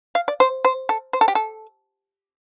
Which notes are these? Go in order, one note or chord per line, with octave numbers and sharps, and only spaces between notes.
F5
D5
C5
C5
A4
C5
A4
G4
A4